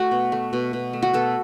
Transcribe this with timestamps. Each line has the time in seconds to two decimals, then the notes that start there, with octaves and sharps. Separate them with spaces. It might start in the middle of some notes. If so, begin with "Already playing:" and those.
Already playing: A3 F#4
0.11 B2
0.32 A3
0.53 B2
0.73 B2
0.93 A3
1.02 F#4
1.13 B2 A4